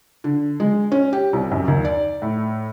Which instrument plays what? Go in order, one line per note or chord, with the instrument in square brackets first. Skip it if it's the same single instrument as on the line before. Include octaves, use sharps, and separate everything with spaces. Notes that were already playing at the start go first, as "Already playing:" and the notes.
[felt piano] D3
G#3
C#4
G4
C2
F#2
D#2
D5
A2